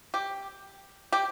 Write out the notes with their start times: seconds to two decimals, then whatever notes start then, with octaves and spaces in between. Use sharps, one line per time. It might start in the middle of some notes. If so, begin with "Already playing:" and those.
0.14 G4
1.12 G4